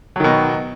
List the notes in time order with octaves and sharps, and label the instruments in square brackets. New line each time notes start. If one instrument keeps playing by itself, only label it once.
[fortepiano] F#3
D#3
B2